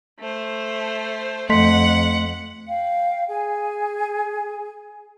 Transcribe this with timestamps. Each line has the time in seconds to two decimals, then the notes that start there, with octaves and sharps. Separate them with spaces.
0.20 A3 C5
1.50 F2 A3 D#5 F#5 C6 B6
2.68 F5 G5
3.29 G#4 G#5